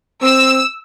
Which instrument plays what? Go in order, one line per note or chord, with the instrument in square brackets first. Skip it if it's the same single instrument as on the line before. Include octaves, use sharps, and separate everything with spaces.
[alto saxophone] C4 [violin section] E6